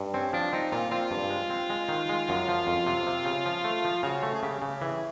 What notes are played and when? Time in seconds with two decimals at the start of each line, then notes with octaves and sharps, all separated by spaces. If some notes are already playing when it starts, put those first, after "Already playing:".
Already playing: G2
0.13 C4 C#4
0.33 F3 D4
0.53 C4 D#4
0.72 A#2 F4
0.91 C4 F4
1.11 G2
1.30 G#3
1.50 C4
1.70 G#3
1.89 D#3
2.09 G#3
2.29 F#2
2.48 F3
2.67 F2
2.87 C3
3.07 C3
3.25 C#3
3.46 F3
3.64 A3
3.85 F3
4.03 C#3 F#4
4.23 A3
4.35 G#4
4.43 C#3 G4
4.62 C#3
4.82 E3 G#4